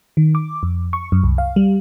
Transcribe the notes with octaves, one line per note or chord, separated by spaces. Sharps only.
D#3
D6
F2
C#6
F#2
C2
F5
G3